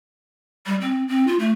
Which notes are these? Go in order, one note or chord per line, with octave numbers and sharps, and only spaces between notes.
G3
C4
C4
F4
A3